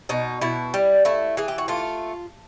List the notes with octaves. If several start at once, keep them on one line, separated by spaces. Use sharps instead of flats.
B2 D#4
B2 E4
G3
A3 E4
E3 G#4
G4
F#4
A3 F4